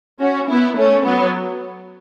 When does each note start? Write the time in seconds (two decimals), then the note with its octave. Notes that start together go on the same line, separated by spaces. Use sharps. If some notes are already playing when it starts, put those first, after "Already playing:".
0.21 C#4 F#4
0.49 B3 E4
0.77 A3 C#4
1.05 F#3 B3